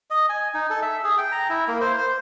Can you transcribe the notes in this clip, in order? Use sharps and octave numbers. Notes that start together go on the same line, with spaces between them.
D#5
G#5
D#4
A4
E5
G#4
G5
A#5
E4
A#3
C5
C5